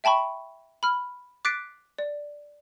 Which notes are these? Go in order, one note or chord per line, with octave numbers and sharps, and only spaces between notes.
E5 G5 A5 B5 C#6
B5 F6
D6 F#6 A6 B6 C7 D7
D5